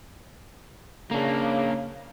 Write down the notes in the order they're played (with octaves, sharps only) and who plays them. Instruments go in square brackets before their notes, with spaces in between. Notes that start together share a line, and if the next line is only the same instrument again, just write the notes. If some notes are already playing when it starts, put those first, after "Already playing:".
[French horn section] C#3 [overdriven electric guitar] A#3 D4